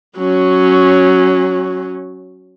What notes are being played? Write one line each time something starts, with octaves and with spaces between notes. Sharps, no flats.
F#3 C#4